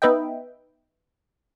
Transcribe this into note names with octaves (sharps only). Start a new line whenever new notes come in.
B3 D#4 B4 D#5 E5 G5